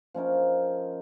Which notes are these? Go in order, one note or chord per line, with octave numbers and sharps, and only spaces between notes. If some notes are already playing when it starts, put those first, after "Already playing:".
F3 C#4 D#4 A#4